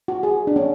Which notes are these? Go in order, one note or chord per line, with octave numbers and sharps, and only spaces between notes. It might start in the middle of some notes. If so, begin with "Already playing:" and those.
F#4
G#4
D4
C#4